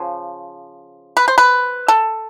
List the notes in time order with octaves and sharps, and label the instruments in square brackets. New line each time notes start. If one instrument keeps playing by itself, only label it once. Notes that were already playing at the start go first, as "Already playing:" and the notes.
Already playing: [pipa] C#3 F3
B4
C5
B4
A4